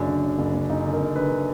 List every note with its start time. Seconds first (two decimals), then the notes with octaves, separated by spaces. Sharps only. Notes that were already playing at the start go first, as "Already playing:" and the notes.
Already playing: F#1 F#2 D4
0.08 D3
0.24 D3
0.39 F#1
0.55 F#1
0.70 F#1 D#4
0.85 D3
0.93 A#4
1.01 F#1
1.16 D3 B4
1.32 D3